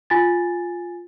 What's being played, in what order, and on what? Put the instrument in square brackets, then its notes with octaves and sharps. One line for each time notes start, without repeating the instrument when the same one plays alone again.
[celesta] F4 G#5 A6